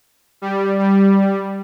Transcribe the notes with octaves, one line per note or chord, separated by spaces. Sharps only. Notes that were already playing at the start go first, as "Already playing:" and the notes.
G3
G3